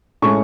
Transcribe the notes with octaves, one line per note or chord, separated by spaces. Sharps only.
A2 G#3 C#4 C#6